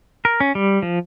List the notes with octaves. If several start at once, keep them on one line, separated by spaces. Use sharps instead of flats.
A#4
C#4
G3
F3